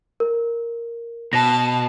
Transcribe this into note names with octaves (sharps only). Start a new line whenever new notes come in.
A#4
B2 A5 A#6